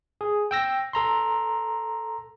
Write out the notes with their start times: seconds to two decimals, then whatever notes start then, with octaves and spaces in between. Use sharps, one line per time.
0.21 G#4
0.51 G5 E6 A#6
0.93 A4 A#5 C6